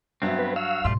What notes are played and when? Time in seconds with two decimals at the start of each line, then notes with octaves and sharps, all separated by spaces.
0.22 G2 F#3 B3 C4 E5
0.39 B4
0.56 F#4 F5 E6
0.84 G#2 B2 G3 A3 F4 C6